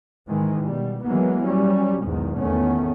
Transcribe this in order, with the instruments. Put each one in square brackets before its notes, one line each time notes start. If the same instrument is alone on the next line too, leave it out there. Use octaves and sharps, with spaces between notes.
[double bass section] G#2 D#3 E3 G#3
B2 G3
E3 F#3 G#3 A#3 B3
F#3 G3 C#4
B1 E2 G#2 D#3
G#1 E2 D#3 A3 B3 C#4